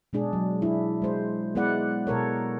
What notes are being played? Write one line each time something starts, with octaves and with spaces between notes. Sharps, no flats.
B2 G#3 D4 G#4
F#3
D4 E4
G#3 C5
G#3 B3 E4 B4 D5 F#5
B2 A4 A#4 C#5